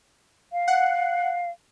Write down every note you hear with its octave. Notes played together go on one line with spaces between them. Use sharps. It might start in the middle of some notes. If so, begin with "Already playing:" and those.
F5
F#5